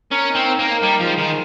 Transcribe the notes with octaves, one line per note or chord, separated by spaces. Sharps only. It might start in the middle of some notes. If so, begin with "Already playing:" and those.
C#4 A#4
D#4
C4
F5
A#3
A#4
G3 D#4
F3 G#3
D#3 F5